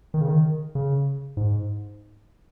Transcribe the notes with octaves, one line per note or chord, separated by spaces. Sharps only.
D#3
C#3
D#3
C#3
G#2